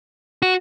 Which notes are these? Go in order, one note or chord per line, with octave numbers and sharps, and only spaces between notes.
F#4